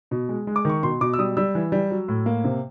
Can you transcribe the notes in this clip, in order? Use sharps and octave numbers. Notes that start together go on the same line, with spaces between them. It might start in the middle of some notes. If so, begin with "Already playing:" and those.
B2
G#3
G#3
D6
D#3 C#6
B2 C6
B2 D6
E6
G3 D#6
G3 E6
E3
G3
F#3
A2
A#3
C3